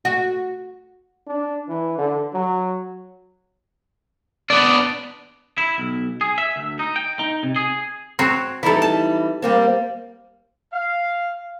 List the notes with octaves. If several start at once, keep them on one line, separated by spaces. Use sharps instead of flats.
F#4
D4
E3
D3
F#3
B3 D4 D5
E4
B1
G#4
E5
D2
D#4
G5
D#4
C3
G#4
C4 F#4 C#5
E3 G3 D#4 E4 A4
A5
G3 A#3 C4
F5